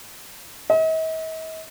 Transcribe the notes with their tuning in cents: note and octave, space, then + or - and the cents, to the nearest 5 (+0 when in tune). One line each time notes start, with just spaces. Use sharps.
D#5 +45